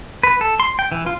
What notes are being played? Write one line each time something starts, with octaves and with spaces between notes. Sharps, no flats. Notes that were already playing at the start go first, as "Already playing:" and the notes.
B4
A4
C6
G5
E3
F4